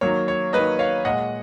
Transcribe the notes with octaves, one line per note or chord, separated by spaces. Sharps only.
D#3 F#3 A#3 C#5
C#5
D#3 F#3 A#3 B4 D#5
C#5 F5
A#2 G#3 D#5 F#5